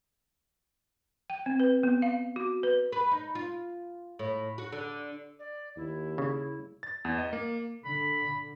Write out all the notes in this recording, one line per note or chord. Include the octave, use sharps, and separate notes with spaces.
G5
C4
B4
B3
F5
F#4
B4
B4
D#4
F4
A2
F#4
D3
D5
D#2 E4
C#3
A6
E2
D#5
A#3
D3 B5